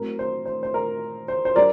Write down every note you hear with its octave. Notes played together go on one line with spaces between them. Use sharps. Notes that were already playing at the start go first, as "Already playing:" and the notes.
Already playing: A2 F#3 C4 A#4
C5
C5
C5
A#4
C5
C5
G3 D4 A#4 D5